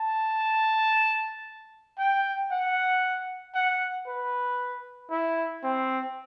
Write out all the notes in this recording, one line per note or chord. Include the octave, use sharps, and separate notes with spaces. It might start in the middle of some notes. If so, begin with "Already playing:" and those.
Already playing: A5
G5
F#5
F#5
B4
E4
C4